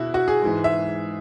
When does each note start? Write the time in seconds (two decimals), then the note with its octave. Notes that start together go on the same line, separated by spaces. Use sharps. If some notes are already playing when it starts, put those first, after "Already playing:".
Already playing: B2 E4 F#4
0.14 F#4
0.28 G#4
0.42 G#2 E3 G#3
0.64 E5